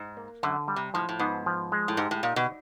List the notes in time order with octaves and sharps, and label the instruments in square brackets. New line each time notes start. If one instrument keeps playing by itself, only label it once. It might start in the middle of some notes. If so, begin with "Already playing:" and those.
Already playing: [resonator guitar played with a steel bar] G#2
[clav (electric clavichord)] A#3
[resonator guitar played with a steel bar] F#2 [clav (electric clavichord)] D3
[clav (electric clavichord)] G3
[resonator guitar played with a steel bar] C3
[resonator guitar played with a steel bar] A2 [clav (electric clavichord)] F3
[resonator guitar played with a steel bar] A2
[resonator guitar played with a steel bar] G#2 [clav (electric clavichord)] B3
[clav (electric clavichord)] F3
G#3
[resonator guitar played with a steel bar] A2
[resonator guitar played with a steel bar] G#2 [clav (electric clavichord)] G4
[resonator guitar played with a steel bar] A2
[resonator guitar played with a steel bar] A#2 [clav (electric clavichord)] D#4
[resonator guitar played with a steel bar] B2